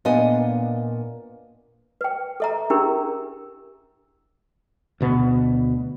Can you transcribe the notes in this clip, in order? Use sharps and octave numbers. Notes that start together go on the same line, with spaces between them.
A#2 B3 D4 D#5 G#5
B4 G5
A4 E5 A#5
C#4 D4 E4 G4 G#4 A#4
D2 B2 B3